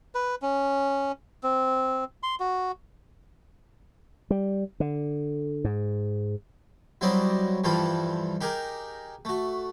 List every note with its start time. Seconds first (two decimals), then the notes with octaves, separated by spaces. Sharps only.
0.15 B4
0.42 C#4
1.43 C4
2.23 C6
2.40 F#4
4.30 G3
4.80 D3
5.64 G#2
7.01 F#3 G3 C4 E4 D5 D#5
7.64 G2 E3 F3 G3 F4 A4
8.41 D#4 G4 G#4 A#4
9.25 A3 F#4